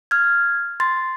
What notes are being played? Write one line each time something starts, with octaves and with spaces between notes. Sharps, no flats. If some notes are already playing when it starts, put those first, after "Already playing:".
F6 G#6
C6 A6